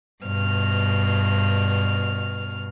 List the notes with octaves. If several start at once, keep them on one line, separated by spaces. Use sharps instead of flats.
G2 B2 F6